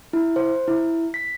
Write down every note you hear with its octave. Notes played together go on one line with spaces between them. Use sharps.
E4
C5
E4
B6